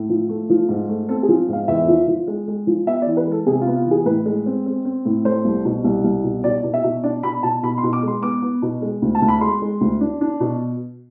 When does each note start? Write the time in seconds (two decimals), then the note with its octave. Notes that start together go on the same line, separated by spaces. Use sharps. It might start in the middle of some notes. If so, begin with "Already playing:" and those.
Already playing: A2
0.09 F3
0.29 A3
0.50 F3
0.69 G#2
0.89 A3
1.09 C4 A4
1.23 G#4
1.29 F3
1.48 G#2 F5
1.68 E2 E5
1.88 F3
2.08 F3
2.28 G#3
2.48 G#3
2.67 F3
2.87 B3 E5
3.02 D5
3.07 E3
3.17 B4
3.27 G#3
3.32 A4
3.46 C3 G#4
3.61 F4
3.67 B3
3.76 F4
3.86 E3
3.91 G#4
4.06 A2 B4
4.26 G#3
4.46 C4
4.66 C4
4.85 C4
5.05 A2
5.25 A3 C5
5.45 C2
5.65 B2
5.84 C2
6.04 C2
6.24 B2
6.44 B2 D5
6.64 B2
6.74 E5
6.84 B2
7.04 D4 D5
7.23 B2 B5
7.43 B2 A5
7.63 B2 B5
7.78 C6
7.83 B2
7.93 D6
8.03 G#3 C6
8.22 B3 D6
8.42 B3
8.62 B2
8.82 G#3
9.02 D2
9.15 A5
9.22 D2
9.28 B5
9.41 G#3 C6
9.62 G#3
9.81 D2
10.01 D4
10.21 D4
10.40 B2